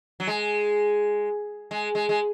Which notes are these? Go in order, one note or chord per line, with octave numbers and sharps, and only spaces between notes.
F#3
G#3
G#3
G#3
G#3